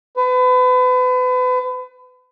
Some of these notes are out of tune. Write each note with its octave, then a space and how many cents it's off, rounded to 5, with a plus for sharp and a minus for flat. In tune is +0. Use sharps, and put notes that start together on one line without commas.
B4 +35